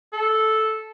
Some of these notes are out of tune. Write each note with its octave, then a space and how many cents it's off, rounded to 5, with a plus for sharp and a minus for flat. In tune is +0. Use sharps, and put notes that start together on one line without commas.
A4 -5